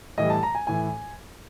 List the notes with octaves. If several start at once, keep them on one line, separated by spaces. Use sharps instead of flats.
A2 E3 G3 D#5
A5
A#5
G#5
A2 E3 G#5